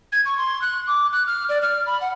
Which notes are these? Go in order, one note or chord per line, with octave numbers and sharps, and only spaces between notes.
G#6
C#6
C6
F#6
D6
F#6
F6
D5
F6
B5
F#5